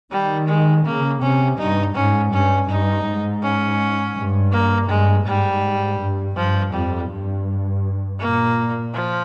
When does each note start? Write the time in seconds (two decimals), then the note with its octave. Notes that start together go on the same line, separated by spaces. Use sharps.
0.11 D#3 G3
0.48 G#3
0.85 C#3 A#3
1.22 C3 C#4
1.58 G2 D#4
1.95 G#2 C#4
2.32 G2 C#4
2.69 G2 D#4
3.06 G#2
3.42 C#4
4.16 G2
4.52 A#3
4.90 G2 G#3
5.26 G#2 G3
6.00 G2
6.36 G2 F3
6.73 F2 G3
7.11 G2
8.20 A#2 A#3
8.94 F3